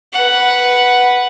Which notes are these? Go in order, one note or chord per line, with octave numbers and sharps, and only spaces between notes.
B4 F#5